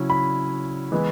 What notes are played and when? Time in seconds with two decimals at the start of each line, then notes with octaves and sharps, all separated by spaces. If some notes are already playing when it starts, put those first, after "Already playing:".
Already playing: C#3 F#3 C#4 E4
0.10 B5
0.92 E3 G#3 B3 E4